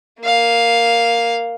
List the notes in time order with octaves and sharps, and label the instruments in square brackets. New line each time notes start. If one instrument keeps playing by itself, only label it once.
[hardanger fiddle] A#3 F5